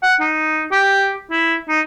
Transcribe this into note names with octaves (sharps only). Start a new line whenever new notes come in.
F#5
D#4
G4
E4
D#4